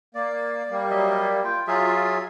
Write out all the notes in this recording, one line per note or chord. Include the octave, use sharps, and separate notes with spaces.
A#3 D5
G3 A#3
F#3 D#5 E5
F4 G5
F#3 F4 G#4 E5